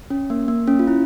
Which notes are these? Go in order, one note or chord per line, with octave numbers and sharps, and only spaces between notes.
C#4
A#3
A#3
C#4
F4
E4